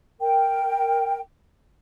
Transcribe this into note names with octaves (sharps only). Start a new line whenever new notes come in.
A#4 G5